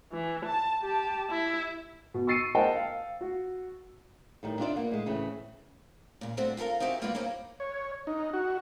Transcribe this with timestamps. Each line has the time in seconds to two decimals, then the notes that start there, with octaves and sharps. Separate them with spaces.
0.12 E3
0.46 A5
0.82 G4 A5
1.30 E4
2.14 B2
2.27 C#6 E6 A6 C7 C#7 D#7
2.55 A#4 C5 D#5 F#5 G5 A5
2.75 F5
3.21 F#4
4.43 A2 D#3 G3
4.59 D4 D#4 F4 F#4 D5 E5
4.75 A#3 B3 F4
4.91 A2 G#3
5.06 A2 C#3 E3 A3 C4 C#4
6.21 A#2 C#3
6.37 G3 A3 C4 D4 F#4 A4
6.57 F4 G4 A4 A#4 F5
6.80 C4 D#4 F#4 G4 E5 G#5
7.02 G3 A#3 F4 F#4 B4 D5
7.15 A#3 C4 C#4 D#4 G4 G#4
7.60 C#5
8.07 D#4
8.33 F#4